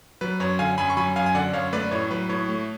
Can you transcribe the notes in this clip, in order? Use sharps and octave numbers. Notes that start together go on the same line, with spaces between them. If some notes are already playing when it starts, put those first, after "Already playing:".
F#3 B4
F#2 C#5
D3 F5 G#5
F#2 G#5 B5
C#6
F#3 G#5 B5
F#2 F5 G#5
G#5
D3 D5 F#5
F#2 C#5 F5
A3 B4 D5
A2 C#5
F#3 B4
A2 C#5
A3